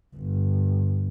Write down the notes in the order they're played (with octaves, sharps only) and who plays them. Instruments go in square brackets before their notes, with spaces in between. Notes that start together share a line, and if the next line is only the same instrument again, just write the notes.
[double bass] G1